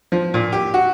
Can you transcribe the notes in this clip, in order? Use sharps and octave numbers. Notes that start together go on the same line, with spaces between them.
F3
A#2
G4
F#4